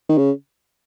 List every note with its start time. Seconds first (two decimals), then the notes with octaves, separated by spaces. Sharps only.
0.09 D#3
0.18 C#3